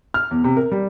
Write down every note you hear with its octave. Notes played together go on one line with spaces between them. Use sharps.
F6
E2
C3
A#4
G3